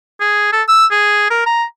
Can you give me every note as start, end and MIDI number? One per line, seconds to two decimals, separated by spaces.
0.21 0.51 68
0.53 0.62 69
0.68 0.86 88
0.91 1.30 68
1.30 1.44 70
1.46 1.64 82